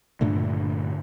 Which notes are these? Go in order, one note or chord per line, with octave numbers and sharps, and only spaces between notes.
G2 A#2 D3 A3